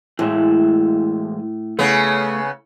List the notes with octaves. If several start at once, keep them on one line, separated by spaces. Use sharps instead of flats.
A2 E3 G#3 E5
C#3 A3 B3